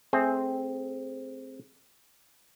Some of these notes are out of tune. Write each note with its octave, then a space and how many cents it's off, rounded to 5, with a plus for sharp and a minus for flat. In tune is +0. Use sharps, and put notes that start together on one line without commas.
A3 -20 C4 +0 G#4 +0